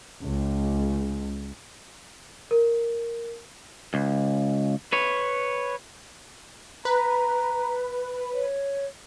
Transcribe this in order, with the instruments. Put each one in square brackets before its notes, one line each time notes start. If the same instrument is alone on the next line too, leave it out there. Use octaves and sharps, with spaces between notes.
[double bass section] C#2
[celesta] A#4
[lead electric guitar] C#2
B4 C#5
[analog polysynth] B4 [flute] A#5
[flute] C#5